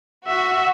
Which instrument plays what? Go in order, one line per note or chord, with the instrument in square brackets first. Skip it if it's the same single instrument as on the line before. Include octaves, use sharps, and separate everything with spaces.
[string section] F#4 [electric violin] E5